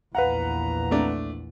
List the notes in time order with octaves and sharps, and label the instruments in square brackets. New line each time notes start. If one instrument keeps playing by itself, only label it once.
[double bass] A#1 E2 [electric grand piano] B4 F5 F#5 [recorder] A#5
[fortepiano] A3 D4